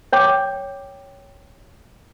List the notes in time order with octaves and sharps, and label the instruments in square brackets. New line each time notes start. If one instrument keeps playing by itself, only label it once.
[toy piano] C#5 G5 D6